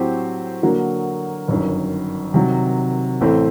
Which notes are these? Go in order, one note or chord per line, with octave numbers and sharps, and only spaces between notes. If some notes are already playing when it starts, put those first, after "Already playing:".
Already playing: A2 F#3 C4 G4 C5
D3 F#3 A#3 F#4 A#4
G1 F#2 D#3
C3 D#3 F#3
A1 A2 A3 C4